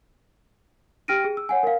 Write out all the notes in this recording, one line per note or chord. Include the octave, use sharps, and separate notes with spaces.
G4 G5 F6 A#6 D7 D#7
G#4
E6
C#5 F#5 G#5
A#4 F5